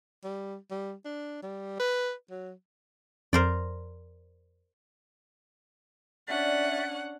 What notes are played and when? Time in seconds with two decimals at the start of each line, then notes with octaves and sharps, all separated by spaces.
0.24 G3
0.71 G3
1.05 D4
1.43 G3
1.80 B4
2.31 F#3
3.33 F2 A#4 C5 D5
6.28 C#4 D4 D5 E5 F#5